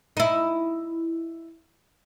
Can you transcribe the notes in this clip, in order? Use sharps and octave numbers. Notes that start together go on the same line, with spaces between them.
D#4 E4